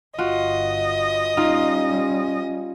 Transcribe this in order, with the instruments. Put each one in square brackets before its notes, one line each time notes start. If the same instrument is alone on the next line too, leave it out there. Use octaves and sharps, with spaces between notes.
[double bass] G1 [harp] F4 F#4 [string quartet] D#5
[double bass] G3 C#4 [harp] D#4 F4